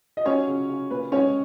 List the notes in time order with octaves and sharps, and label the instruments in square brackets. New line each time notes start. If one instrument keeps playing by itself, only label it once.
[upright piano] D#5
F#3 C#4 C#5
C#3
C#3
A#2 B4
G#3 C#4 C#5